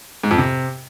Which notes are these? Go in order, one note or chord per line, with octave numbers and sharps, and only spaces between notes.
G#2
F2
C3